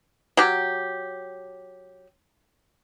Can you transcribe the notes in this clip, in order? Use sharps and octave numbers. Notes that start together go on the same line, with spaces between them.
F#3 G4